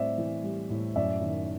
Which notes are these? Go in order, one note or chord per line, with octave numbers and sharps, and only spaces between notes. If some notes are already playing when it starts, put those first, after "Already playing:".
Already playing: A2 G3 C4 D5 E5
E3
G3
A2
F#2 D5 E5
D#3